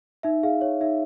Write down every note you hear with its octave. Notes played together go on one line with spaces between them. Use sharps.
D#4 E5
G#4 F5
C#5
D#4 E5